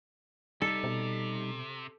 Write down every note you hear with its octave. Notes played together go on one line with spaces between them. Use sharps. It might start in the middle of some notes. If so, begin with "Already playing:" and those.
C3 G3 D#4 A4
B2